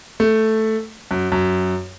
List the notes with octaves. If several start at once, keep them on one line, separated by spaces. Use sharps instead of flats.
A3
F#2
F#2